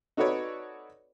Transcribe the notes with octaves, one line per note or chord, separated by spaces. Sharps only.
D#4 F#4 A4 B4 C#5 D5